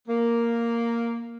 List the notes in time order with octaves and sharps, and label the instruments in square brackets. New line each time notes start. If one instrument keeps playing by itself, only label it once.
[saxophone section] A#3